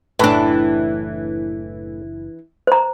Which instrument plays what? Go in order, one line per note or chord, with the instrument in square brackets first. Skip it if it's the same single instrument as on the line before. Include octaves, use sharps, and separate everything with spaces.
[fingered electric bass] F#1 [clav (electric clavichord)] A2 [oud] E3 D4
[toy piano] C5 A#5